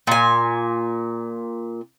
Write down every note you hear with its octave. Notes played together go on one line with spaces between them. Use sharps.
A#2 G#5